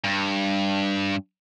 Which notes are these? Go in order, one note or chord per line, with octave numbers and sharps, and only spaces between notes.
G2